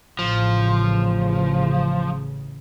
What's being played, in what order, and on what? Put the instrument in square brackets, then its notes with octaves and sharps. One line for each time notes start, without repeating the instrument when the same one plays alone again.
[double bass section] A1 C#3 E3 [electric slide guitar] F3